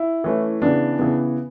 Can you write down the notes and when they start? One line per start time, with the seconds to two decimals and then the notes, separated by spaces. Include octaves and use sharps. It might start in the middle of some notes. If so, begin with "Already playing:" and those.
Already playing: E4
0.24 E3 A3 C#4
0.62 C#3 E3 B3 D4
0.99 C#3 E3 B3